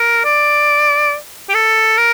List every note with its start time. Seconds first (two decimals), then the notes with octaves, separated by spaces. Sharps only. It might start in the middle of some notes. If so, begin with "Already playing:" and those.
Already playing: A#4
0.25 D5
1.49 G4
1.54 A4
1.98 A#4